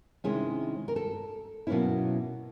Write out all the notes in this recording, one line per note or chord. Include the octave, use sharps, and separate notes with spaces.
C3 D#3 G#3 C#4 E4 G#4
A#4
A4
B2 F#3 A#3 C#4 E4